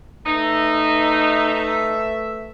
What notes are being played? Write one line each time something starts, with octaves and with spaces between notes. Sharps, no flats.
A3 D#4 B4 E5